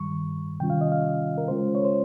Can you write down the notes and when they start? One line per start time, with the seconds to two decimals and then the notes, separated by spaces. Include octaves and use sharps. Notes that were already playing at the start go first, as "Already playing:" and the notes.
Already playing: G2 D#3 G3 C#6
0.60 C3 D#3 G3 C#4 F4 G5
0.70 F5
0.81 D#5
0.92 F5
1.38 A#4
1.48 C#3 G#3 C#4 F4 C5
1.75 C#5
1.85 C5